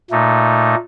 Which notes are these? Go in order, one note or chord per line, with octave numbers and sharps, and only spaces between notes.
A#2 A3 D#4